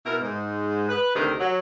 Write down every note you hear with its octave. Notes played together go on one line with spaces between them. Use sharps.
B2 E4 A#4
G#2
B4
D2 C3 D#3 A#4
F#3